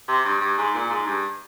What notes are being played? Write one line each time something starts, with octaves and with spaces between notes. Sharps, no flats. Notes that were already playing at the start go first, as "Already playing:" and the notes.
C3
G2
G2
G#2
A#2
G#2
G2